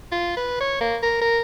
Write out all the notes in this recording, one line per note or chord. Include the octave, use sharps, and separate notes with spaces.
F4
B4
C#5
A#3
A#4
A#4